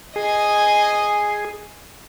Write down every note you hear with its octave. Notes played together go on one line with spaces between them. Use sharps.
G#4 D#5 G#5